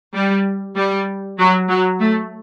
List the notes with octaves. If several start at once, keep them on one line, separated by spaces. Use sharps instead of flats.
G3
G3
F#3
F#3
A3